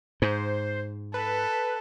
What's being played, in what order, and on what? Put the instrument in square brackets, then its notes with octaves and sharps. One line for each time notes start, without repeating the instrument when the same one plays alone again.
[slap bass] G#2 [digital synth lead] C5
[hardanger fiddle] A4 [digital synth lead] B4